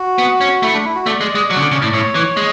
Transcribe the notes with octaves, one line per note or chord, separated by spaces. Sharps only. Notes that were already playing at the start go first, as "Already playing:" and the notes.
Already playing: F#4
B3
C#4
A3 E4
D4
E4
F#4
A3 D5
G#3
G#3
F#3
C#3
D3
C#3
A2 D5
A2 C#5
E3
G#3